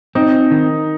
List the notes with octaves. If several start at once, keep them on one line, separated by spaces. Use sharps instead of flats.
C4 D#4
D#3